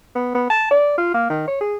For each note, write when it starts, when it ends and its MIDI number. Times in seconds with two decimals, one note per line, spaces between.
0.15 0.34 59
0.35 0.47 59
0.50 0.69 81
0.71 0.94 74
0.98 1.13 65
1.14 1.28 58
1.30 1.45 51
1.48 1.59 73
1.61 1.77 68